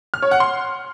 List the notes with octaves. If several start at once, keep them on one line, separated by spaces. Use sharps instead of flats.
F6
C#5
F#5
C6